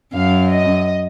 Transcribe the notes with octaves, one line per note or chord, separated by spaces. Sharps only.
F#2 F5
D#5